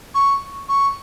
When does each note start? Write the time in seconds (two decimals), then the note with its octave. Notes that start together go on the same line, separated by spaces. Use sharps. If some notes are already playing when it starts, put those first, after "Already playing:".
0.15 C#6
0.69 C#6